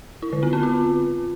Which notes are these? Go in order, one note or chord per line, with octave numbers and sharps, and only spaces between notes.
E4
D3
B3
C4
F4